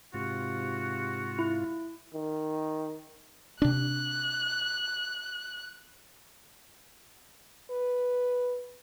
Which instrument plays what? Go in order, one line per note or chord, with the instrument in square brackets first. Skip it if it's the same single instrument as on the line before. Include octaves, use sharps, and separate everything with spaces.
[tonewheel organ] G#2 F4 [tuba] C3 [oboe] F#4
[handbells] E4
[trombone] D#3
[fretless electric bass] C3 D4 [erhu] F#6
[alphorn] B4